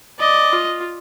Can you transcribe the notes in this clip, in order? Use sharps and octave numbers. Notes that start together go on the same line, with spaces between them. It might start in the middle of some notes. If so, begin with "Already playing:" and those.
D5 D#5
F4